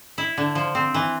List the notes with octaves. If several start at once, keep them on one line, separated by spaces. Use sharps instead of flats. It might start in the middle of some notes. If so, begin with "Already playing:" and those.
E4
D3
F3
C4
E3